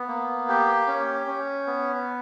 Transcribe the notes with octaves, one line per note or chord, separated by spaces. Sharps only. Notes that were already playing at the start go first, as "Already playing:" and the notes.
Already playing: B3
A#3
G4
C#4
C#4
B3